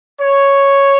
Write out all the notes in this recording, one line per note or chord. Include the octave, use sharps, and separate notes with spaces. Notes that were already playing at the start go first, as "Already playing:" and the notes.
C#5